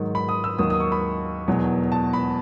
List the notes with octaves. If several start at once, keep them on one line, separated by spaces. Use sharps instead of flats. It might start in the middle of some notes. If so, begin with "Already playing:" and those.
Already playing: G#2 D#3 F#3
B5
D#6
E6
D#2 D#3 F#3 D#6
D#6
C#6
B5
E2 B2 F#3
A5
B5